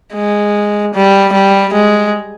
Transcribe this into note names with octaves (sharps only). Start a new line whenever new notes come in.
G#3
G3
G3
G#3